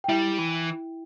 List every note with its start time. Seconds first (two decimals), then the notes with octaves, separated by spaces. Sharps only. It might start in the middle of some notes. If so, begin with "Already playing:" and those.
0.04 G5
0.08 G3 E4 E5
0.38 E3